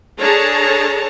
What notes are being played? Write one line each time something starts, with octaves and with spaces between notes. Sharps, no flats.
D4 G#4 A4 C#5 A5 A#5